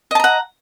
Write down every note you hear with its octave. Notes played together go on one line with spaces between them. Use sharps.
D#5 F#5 A5 A#5